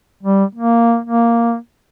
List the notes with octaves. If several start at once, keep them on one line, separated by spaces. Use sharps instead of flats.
G3
A#3
A#3